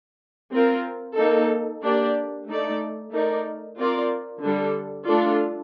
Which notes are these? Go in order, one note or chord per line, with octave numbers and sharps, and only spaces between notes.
C4 F4 A#4
A#3 D#4 A4
A#3 D4 G4 D5
A3 D#4 A4 D5
A3 D#4 A#4 D5
C4 F4 A#4 D5
D3 G3 D4 A4
A3 D4 F4 A4 D5